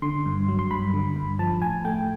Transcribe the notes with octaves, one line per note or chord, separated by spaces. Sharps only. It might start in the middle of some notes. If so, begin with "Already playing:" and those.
D3 C6
G2
F#3
C6
G2 B5
D3
G2
F3 A5
A2 G#5
A3 G5